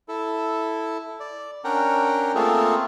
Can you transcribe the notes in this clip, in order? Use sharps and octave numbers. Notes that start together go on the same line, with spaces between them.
E4 A4
D5
C#4 D4 A#4 F#5 G5 A#5
A3 A#3 C4 F4 G#4 A4